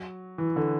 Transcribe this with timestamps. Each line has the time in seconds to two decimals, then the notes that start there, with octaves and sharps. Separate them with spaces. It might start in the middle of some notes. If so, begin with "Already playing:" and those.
Already playing: F#3
0.38 E3
0.56 D3